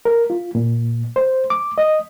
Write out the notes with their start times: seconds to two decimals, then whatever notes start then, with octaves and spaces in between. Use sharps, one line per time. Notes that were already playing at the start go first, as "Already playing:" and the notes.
0.05 A#4
0.30 F4
0.55 A#2
1.16 C5
1.50 D6
1.78 D#5